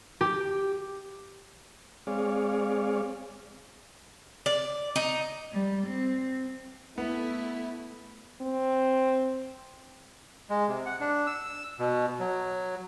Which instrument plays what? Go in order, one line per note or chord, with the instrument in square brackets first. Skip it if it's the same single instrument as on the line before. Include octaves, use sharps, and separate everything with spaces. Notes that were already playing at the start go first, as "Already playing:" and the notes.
[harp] G4
[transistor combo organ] G#3 C4 G#4 C#5 D5 F5
[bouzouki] D5
D#4
[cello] G3
C4
[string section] A3 E4 [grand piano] B3
[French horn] C4
[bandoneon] G#3
C3
F#5
D4
E6
B2
F#3